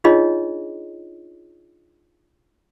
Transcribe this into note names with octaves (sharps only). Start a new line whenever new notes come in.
D4 D#4 F4 G#4 C#5 D#5